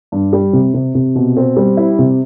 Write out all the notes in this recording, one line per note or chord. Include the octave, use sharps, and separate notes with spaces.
G2
G3
C3
C3
C3
B2
C4
G3
E4
C3